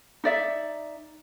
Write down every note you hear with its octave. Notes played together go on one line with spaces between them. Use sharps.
D#4 D5 E5